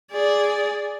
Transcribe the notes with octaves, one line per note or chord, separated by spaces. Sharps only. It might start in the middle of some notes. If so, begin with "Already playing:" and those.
G#4 D5